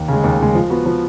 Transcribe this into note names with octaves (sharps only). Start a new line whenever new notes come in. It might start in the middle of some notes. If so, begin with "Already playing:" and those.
Already playing: D#2
C#3 G#3
D#2
C#3 G#3
F3
B3 F#4
F3